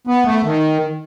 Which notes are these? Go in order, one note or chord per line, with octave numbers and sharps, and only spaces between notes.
B3
A3
D#3